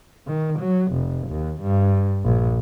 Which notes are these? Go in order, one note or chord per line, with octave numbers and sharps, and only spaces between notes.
D#3
F#3
F1
D#2
G2
A#1